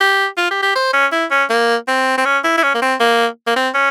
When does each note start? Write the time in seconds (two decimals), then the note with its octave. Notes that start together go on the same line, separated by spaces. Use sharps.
0.01 G4
0.37 F4
0.51 G4
0.63 G4
0.75 C5
0.93 C#4
1.12 E4
1.31 C#4
1.50 A#3
1.88 C4
2.18 C4
2.25 C#4
2.44 E4
2.58 E4
2.63 C#4
2.75 A#3
2.82 C4
3.00 A#3
3.47 A#3
3.56 C4
3.74 C#4